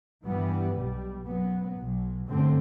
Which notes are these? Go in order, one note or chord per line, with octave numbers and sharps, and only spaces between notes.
G2 E3 G3 B3
B1 B2 G3
F#2 F#3 B3
B1 B2 F#3
G1 F#2 D3 A3 C4